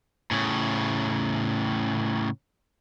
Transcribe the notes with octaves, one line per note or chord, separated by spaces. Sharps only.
A2 C#3